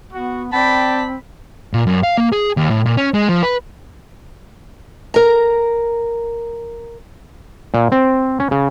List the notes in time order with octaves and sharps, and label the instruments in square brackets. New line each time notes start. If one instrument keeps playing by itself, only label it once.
[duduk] B3 [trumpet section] F#4
[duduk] C4 [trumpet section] D5 G5 A5 [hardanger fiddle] B5
[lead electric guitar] A#2
F#2
F5
A#3
G#4
D#2
A2
A#2
C#4
G#3
F3
B4
[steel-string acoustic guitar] A#4 A#5
[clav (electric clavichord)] A#2
C4
C#4
C#3